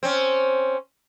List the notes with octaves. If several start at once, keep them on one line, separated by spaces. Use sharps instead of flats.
C4 C#4